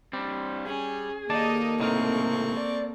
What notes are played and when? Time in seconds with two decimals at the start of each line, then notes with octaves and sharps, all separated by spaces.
0.13 G3 C4 D4
0.66 C#4 G#4
1.30 D#2 A#3 D#4 A4 D5 D#5 A5
1.80 C#2 A2 C3 C4 D#4 A#4 C#6
2.57 D5